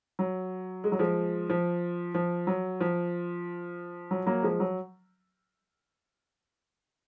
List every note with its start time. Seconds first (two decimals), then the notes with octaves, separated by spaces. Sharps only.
0.19 F#3
0.84 G#3
0.92 F#3
0.99 F3 G#3
1.50 F3
2.14 F3
2.47 F#3
2.81 F3
4.11 F#3
4.26 F#3 A#3
4.43 F3 G#3
4.60 F#3